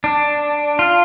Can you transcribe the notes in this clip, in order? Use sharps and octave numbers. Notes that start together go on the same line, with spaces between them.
D4
F4